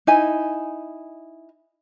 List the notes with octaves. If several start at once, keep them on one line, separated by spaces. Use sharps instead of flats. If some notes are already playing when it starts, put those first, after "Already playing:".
D#4 E4 G#5